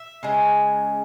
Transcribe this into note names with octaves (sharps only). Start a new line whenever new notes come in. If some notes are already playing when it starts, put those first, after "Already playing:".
Already playing: E5
C#3 G#3